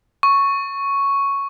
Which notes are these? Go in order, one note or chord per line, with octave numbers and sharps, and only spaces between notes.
C#6